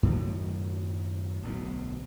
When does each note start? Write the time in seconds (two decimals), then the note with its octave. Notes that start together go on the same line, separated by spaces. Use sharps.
0.03 F#2 A2 D#3 F#3
1.43 D1 B1 G#2